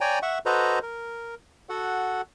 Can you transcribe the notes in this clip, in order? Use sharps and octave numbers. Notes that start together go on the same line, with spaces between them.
C#5 D5 G5 G#5 A#5
E5 F#5 C#6
F#4 A4 B4 C5 D#5 A#5
A#4
F#4 A4 F#5